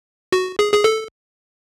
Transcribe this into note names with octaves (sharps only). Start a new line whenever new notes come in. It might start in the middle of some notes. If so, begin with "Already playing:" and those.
F#4
G#4
G#4
A4